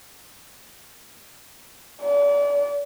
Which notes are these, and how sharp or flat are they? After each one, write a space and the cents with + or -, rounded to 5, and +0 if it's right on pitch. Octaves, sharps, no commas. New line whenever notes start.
D5 -35